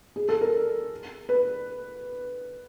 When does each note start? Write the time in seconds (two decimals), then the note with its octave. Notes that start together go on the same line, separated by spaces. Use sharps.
0.16 G#4
0.29 A4
0.41 A#4
1.29 B4